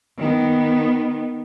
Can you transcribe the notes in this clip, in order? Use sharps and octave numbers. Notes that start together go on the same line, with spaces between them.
D#3 B3